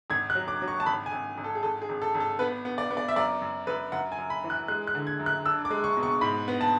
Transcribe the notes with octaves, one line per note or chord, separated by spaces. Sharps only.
G#1 G#6
F#6
F#3
D6
F#3
C#6
A5
G#1 B5
G#5
G#1
G#1
A4
G#4
G#1 A4
G#4
G#1
A4
G#1
A4
B3 B4
B3
D5
B3
D5
E5
F#2 D5
F#2
F#2 B4
F#2 F#5
G#5
F#2
B5
E3
F#6
G#3 F#6
F#6
D3
G#6
F#2
F#6
D4 E6
D6
G#3
C#6
B2
C#6
G#2 B5
B3
A5